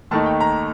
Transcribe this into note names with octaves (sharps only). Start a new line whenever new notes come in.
D#2 D#3 A3 D#4 A5
G5
A#5